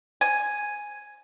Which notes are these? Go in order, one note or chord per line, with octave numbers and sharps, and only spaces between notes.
G#5